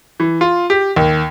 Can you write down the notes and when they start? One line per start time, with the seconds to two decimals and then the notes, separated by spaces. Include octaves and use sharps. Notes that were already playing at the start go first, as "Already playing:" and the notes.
0.20 E3
0.41 F4
0.70 G4
0.96 D#2